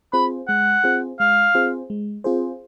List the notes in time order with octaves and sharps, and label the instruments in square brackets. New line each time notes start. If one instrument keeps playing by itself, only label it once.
[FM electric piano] C4 F4 G#4 C5 [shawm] B5
[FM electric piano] G#3 [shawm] F#5
[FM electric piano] C4 F4 G#4 C5
[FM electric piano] G#3 [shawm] F5
[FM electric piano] C4 F4 G#4 C5
G#3
C4 F4 G#4 C5